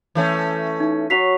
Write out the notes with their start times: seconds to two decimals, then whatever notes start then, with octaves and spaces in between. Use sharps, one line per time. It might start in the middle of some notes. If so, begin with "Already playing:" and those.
0.15 E3 A3 C#4
0.80 D#4
1.10 F#3 F#4 C#6 B6 C7 F7